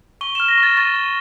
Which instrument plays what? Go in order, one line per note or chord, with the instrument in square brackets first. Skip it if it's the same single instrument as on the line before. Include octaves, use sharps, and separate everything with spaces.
[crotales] C#6 G7
E7
F6
A#6
C#6
A6
C#6 A6
C#6